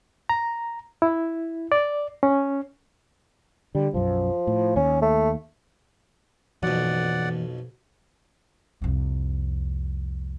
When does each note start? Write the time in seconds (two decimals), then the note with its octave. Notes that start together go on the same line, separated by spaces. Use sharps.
0.29 A#5
1.02 E4
1.72 D5
2.23 C#4
3.75 D3 G3
3.94 B1 F#2 F3
4.47 A2
4.76 D#2 C#4
5.02 A3
6.63 B1 F2 E3 F3 A#3 D5 F#5
8.82 C2 F2